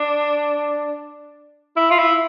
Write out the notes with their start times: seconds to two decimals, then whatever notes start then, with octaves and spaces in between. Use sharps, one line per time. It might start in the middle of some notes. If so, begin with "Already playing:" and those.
Already playing: D4
1.77 E4
1.91 F4
1.99 E4